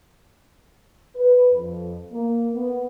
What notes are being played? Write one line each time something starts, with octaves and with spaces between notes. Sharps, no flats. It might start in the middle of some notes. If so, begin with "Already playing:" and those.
B4
F2
A#3
B3